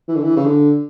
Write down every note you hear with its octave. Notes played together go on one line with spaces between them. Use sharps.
E3
D3
E3
C#3
D3